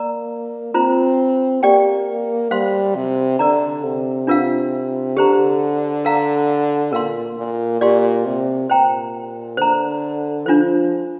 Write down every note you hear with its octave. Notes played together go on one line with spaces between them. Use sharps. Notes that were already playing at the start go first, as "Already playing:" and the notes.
Already playing: A#3 A#4 D5 A#5
C4 F4 C5 A#5
A#3 G4 D5 G5
G3 C5 F5 C6
C3
D3 A#4 D5 A#5
C3
D4 F4 A#4 F5
D3 G4 C5 A#5
A#4 F5 A#5
A#2 A#4 F5 C6
A#2
A#2 G4 D5 F5 C6
C3
A#2 C5 G5 A#5
D3 C5 A#5
F3 D4 F4 C5